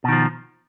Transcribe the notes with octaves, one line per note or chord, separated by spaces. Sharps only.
B2 D#3 F3